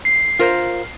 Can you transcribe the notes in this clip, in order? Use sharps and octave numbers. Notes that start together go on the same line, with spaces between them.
C7
F4 A#4 C5